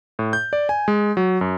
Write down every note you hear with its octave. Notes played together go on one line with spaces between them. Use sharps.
A2
G6
D5
G#5
G#3
F#3
F#2